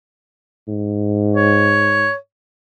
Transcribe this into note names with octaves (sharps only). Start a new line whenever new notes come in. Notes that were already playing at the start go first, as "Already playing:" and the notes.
G#2
C#5